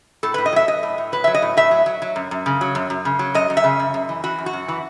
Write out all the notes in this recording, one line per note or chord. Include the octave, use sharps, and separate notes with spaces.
A2 A4
A2 B4
D#5
F#3 E5
F#3 D#5
A2
A2
F#3 B4
F#3 E5
D#5
A2
A2 E5
F#3
F#3
F#3
F#2
F#2
C#3
F#3
F#2
F#2
C#3
F#3
F#2 D#5
F#2
E5
C#3
F#2
F#2
E3
E3 F#4
F#2
F#4
F#2
E3